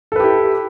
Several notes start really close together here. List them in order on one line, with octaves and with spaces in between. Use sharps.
A4 B4 G4 E4